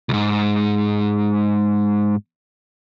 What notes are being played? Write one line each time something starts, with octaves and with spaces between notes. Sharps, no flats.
C#2 G#2